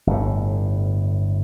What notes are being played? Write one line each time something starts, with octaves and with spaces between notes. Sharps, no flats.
G1 A2